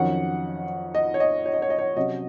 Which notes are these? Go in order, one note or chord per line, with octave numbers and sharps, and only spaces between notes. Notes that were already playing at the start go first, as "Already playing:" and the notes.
Already playing: F2 D#3 F#3 C#4 F#5
D#5
C#5
D#5
C#5
D#5
C#5
D#5
C#5
C3 F#3 C#4 D#5